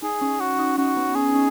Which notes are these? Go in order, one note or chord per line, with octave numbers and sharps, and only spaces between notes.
D#4 G#4
C#4
C#4 F#4
D#4
C#4 F#4
B3
C#4 G#4
D#4
C#4